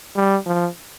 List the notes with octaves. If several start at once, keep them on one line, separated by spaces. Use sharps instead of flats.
G3
F3